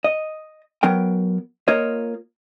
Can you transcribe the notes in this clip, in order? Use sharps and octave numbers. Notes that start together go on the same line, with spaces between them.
D#5
F#3 B3 A#4 G5
A#3 F4 A#4 C#5 D#5